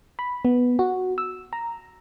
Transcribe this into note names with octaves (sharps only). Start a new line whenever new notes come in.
B5
B3
F#4
E6
A#5